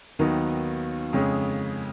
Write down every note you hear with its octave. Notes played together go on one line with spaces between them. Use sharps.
D#2 D#3 F#3 B3 D#4
F2 C#3 G#3 C#4 G#4